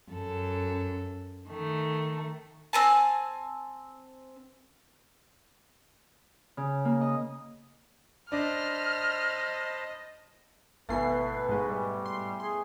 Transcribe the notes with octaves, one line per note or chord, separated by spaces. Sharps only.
F#2 A4
D#3 A3
C4 G#5 A5
C#3
A#3
D#5
D4 C5 D#5 A5 B5 F6
G#1 B2 E3 A3 B3 B4 C7
G#2 G#3
G3
C6
G#4 C6